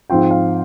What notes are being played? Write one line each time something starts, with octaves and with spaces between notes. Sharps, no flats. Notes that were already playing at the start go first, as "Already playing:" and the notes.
G#2 F3 C4 F4 G5
F5